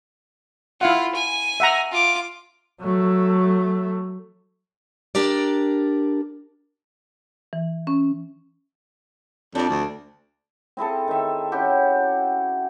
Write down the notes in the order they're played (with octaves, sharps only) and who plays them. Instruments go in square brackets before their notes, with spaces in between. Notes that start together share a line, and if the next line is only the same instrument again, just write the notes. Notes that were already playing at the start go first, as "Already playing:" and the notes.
[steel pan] E4 F5 F#5 [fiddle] F4
[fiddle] G#5
[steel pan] E5 F#5 A#5
[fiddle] F4 D6
[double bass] F#3 A3
[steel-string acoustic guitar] D4 G4 A#4 D5
[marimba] E3
C#4
[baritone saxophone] F2 [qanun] D4 D5
[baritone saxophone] D2
[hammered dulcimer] C4 E4 G#4 A4
D#3 E5
C#4 E4 F#4 G4